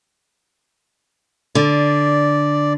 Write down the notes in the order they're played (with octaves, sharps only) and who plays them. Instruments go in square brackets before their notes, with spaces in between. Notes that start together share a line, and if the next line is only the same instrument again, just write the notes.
[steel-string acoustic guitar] D3 [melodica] D5